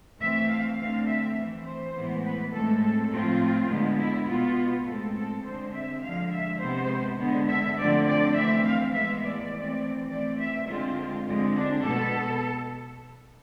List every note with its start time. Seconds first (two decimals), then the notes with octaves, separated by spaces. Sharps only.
0.19 E3 A3 C4 E5
0.49 F5
0.78 D3 A3 C4 F5
1.07 E5
1.36 E3 A3 C4
1.66 C5
1.94 A2 E3 G#3 B3
2.23 B4
2.53 A2 G#3 C4 A4
2.82 A4
3.10 A2 F3 A3 C4 F4
3.69 D3 G#3 B3
3.99 E4
4.27 B2 B3 F4
4.86 A2 G#3 C4 A4
5.15 A4
5.44 D3 G#3 C4 C5
5.73 E5
6.02 D3 F3 G#3 F5
6.31 E5
6.60 C3 G#3 B3 C5
7.18 D3 G#3 B3
7.48 E5
7.77 D3 F3 A3 C4 D5
8.06 D5
8.34 E3 A3 C4 E5
8.64 F5
8.93 A2 E3 G#3 B3 E5
9.23 D5
9.52 E3 A3 C4
10.10 E3 A3 C4 D5
10.39 E5
10.67 D3 G#3 C4 F4
11.27 D3 G#3 C4
11.56 D4
11.85 B2 B3 A4